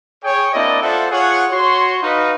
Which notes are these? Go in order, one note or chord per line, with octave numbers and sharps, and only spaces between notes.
G#4 C#5 G5
A#3 C4 D4 E4 D5 D#5
F4 A4 C5 D5 E5 F#5
F4 G#4 C#5 F#5
F#4 C#5 C6
D#4 F#4 B4 D#5 F5 B5